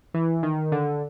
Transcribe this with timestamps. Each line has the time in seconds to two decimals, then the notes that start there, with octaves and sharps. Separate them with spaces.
0.14 E3
0.43 D#3
0.72 D3